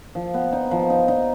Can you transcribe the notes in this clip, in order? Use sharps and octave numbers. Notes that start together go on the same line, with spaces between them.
F3
B3
D#4
F3
D#4
D#4